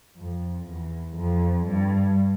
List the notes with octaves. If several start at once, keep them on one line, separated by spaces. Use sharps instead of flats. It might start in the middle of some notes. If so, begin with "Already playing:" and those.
F2
E2
F2
G2